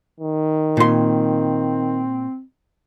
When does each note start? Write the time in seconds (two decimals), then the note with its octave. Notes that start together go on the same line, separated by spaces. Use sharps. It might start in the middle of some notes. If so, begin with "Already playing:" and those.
0.20 D#3
0.77 A#2 C4 C6